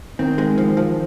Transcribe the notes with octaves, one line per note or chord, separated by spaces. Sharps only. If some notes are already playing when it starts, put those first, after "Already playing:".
D#3 C4
G#3
F3
F3